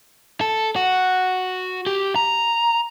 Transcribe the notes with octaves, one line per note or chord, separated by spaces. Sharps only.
A4
F#4
G4
A#5